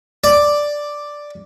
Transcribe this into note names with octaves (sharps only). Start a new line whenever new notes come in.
D5